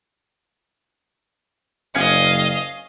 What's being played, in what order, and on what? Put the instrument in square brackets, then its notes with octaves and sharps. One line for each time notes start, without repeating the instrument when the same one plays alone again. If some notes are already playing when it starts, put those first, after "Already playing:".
[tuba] F#1 [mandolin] C#4 G#5 F#6 [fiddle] D#5 F5